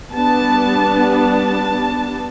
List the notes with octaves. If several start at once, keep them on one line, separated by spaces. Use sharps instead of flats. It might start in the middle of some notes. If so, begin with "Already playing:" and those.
G3 B3 D4 A5
A5